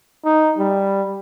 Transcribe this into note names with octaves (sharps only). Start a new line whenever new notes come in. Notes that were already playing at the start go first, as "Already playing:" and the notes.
D#4
G3